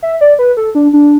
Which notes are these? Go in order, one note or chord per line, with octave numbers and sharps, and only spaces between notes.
E5
D5
B4
A4
D4
D4